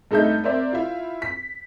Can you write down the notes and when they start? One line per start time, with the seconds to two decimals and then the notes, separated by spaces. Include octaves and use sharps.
0.11 G2 A3 D#4 A4 E5 G6
0.44 C4 A#4 C5 D5 E5
0.73 E4 F4
1.22 B6